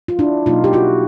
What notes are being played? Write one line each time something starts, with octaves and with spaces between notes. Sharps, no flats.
F4
D4 E4
B2 F#3 A#3 D#4 F4
G4
E4 F#4